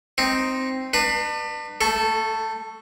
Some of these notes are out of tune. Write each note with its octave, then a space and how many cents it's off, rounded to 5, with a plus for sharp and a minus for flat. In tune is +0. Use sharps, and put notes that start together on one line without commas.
C4 +0 D#4 +0
D4 +35 B4 +0
A3 +15 A4 -15